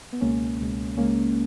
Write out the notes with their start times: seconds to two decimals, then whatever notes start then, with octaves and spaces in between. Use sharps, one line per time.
0.13 B3
0.21 C#2 B2 G#3 A#3 C#4
0.60 C#2 B2 G#3
0.97 C#2 C#3 G#3 A#3 C#4